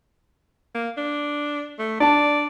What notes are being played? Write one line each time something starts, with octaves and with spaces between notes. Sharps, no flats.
A#3
D4
A3
D4 D5 A5